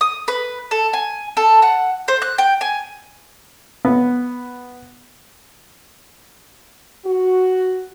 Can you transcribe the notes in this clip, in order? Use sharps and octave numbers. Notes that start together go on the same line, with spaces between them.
D#6
B4
A4
G#5
A4
F#5
C5
F#6
G5
G#5
B3
F#4